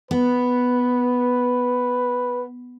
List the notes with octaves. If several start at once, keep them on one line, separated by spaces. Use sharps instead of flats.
B3 B4